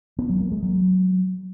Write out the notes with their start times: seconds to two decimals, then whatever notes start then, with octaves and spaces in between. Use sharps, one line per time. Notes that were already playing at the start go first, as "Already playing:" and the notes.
0.19 B3
0.30 F#3
0.41 A#3
0.52 G#3
0.63 F#3